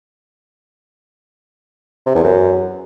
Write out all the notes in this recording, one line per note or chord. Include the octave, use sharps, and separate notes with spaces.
C3
E2
F#2